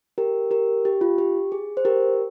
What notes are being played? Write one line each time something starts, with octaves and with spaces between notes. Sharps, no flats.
G4 A#4
G4 A#4
G4
F4
G4
G#4
C5
G4 A#4